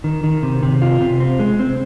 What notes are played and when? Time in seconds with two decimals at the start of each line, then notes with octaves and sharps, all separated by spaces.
0.04 D#3
0.24 D#3
0.43 C3
0.63 C3
0.82 F4
1.01 C3
1.20 C4
1.40 G#3
1.59 C4